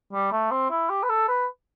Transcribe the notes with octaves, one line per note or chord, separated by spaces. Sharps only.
G3
A3
C4
E4
G4
B4
A4
B4